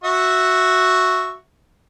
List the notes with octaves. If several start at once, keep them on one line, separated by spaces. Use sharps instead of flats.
F#4 E5 C#6